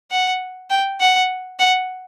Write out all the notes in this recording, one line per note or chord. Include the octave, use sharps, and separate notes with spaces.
F#5
G5
F#5
F#5